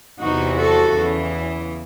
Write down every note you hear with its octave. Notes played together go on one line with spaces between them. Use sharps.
E2 C3 E3 D#4 F#4
F#4 A4
E2 C#3 E3